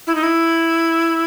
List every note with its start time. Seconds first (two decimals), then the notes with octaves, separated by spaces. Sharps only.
0.07 E4
0.15 D#4
0.23 E4